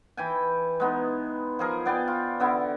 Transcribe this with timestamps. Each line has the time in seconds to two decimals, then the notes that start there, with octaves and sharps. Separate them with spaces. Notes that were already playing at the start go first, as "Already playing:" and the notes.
0.17 E3 G5 G#5
0.80 G#3 B3 D#4
1.59 F3 G#4 A#4
1.86 B3 D5 G5 G#5
2.08 F4
2.40 D3 B3 E4